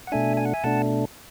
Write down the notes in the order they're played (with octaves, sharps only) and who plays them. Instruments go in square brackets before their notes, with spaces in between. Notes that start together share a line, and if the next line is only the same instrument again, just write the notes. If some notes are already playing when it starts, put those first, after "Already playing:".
[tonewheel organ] F#5
B2 A3 D4 E5 G#5
G#5
F#5
E5 G#5
B2 A3 D4 F#5 A5